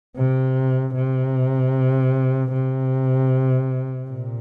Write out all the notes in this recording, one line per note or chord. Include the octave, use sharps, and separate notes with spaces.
C3
C3
C3
A#2